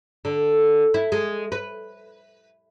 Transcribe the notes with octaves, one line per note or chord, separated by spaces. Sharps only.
D3
E4
G#3
B4